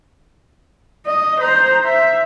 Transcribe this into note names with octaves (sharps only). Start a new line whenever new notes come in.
D#5
C5 A#5
E5